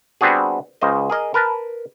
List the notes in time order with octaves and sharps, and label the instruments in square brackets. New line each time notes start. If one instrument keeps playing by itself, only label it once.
[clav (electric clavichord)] G3 B3 C4 D4 F#4 G#4
C#2 C#3 C5 D#5
G#4 A#4 D#5
A#4 B4 A5